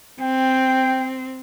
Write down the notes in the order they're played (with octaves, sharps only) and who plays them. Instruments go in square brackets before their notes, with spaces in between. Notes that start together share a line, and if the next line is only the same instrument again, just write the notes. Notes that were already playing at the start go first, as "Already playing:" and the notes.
[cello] C4 [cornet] G5